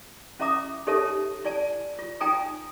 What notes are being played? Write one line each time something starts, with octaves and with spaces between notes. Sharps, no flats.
C#4 E4 E5 A#5 D6 D#6
D#4 G4 A4 C#5 E5 A5
E4 D5 G#5 A5
F4
D#4 F4 G5 G#5 A#5 D#6